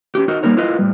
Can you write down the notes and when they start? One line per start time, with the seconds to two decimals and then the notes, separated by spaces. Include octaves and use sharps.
0.15 C#4 G4
0.28 D#4 F#4 A#4 D#5
0.43 G3 A#3 D#4 A#4 C#5
0.56 E4 F4 A#4 B4 D#5 F5
0.79 A2 G3